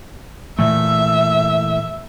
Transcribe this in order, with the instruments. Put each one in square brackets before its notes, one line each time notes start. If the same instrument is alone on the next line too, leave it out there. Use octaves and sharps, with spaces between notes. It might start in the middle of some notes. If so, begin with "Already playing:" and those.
[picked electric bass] A#2 E3 A3 [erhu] E5